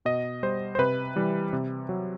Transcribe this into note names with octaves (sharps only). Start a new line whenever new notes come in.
B2 D#5
G3 C5
C5
C3 B4
E3 G3
C3
F#3